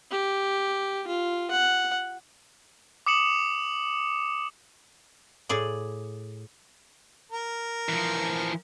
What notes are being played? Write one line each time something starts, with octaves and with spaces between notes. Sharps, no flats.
G4
F4
F#5
D6 D#6 C#7 E7 F#7
A2 G#4 D5
A#4
E3 F3